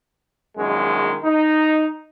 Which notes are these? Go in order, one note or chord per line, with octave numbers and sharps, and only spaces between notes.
A#1 F#2 D#3 G#3
D#4